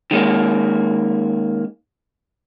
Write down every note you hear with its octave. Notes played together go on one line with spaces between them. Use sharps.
D#3 G#3 A#3 C#4